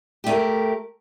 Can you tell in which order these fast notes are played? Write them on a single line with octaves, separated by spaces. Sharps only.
G4 A3 A#4